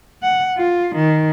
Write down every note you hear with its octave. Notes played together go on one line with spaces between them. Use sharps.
F#5
F4
D#3